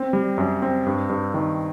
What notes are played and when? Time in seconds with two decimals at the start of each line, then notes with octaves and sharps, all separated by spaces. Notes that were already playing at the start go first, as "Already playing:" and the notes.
Already playing: C4
0.13 G3
0.38 F#2
0.62 C4
0.86 G2
1.09 G2
1.34 D#3